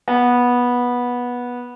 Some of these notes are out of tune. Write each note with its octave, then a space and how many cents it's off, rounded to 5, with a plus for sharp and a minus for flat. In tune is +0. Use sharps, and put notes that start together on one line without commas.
B3 -15